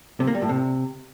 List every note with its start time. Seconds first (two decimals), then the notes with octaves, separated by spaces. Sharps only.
0.20 C3
0.27 A#3
0.35 G3
0.42 A2
0.49 C3